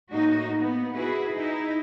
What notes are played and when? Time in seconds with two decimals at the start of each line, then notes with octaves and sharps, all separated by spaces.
0.11 A2 A#3 D#4 F#4
0.58 B3
0.95 E4 F#4 G#4 B4
1.33 D#4 E4